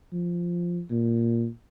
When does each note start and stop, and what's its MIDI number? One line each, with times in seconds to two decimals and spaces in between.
0.13 0.82 53
0.90 1.48 46